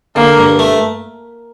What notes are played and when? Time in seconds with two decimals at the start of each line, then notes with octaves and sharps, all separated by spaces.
0.15 D3 A#3
0.38 G2
0.59 A3